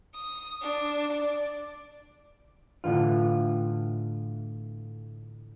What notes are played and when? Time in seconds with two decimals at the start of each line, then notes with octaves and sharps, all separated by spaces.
0.15 D#6
0.61 D4
1.12 D5
2.84 A2 D3 E3 F4